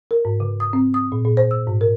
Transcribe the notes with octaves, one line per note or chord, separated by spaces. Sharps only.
A#4
G#2
C#3
D#6
C4
D#6
A#2
A#2
C5
E6
G#2
A#4